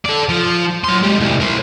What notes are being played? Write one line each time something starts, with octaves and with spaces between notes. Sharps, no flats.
A4 D5
F3
F#3 C6
G#3 G4
C2 A2
A#4 C5